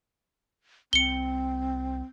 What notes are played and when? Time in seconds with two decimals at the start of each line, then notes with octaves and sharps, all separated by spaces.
0.93 C2 C4 C#7 G7